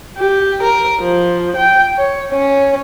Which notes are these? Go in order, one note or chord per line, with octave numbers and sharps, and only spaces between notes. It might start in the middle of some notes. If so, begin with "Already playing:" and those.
G4
A#4
F3
G5
C#5
C#4